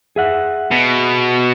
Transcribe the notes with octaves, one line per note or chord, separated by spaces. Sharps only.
G#4 E5 F#5
B2